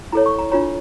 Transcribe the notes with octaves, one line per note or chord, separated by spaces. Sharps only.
E4 A4 C#5 A#5
C#6
A#5
D4 F4 C#5 A#5